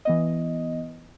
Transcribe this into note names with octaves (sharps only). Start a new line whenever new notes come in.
E3 B3 D#5